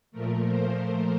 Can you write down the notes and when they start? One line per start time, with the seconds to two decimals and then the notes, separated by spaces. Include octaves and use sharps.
0.12 A#2 F3 A3 A#4
0.44 C5